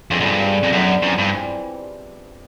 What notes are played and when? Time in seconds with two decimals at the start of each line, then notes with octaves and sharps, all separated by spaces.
0.10 F2 D3 F3 G#3 B3
0.21 F#2
0.26 G2
0.41 D3 G3 B3 D4
0.63 F2
0.72 F#2 D3 G3 B3 D4
1.02 F#2 E3 G3 C4 E4
1.18 G2
1.33 E3 G3 C4 E4